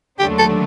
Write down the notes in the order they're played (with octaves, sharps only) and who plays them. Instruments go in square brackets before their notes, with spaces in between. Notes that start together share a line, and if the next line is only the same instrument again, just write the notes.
[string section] D#2 D3 F#3 A3 D4 [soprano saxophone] G4
[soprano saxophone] A4